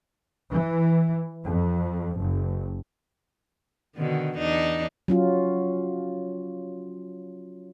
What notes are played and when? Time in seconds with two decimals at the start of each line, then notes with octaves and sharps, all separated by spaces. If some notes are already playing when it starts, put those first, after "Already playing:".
0.50 E3
1.45 F2
2.18 F#1
3.96 B2 D3 D#3
4.37 E2 D4 D#4
5.08 F#3 C#4 F4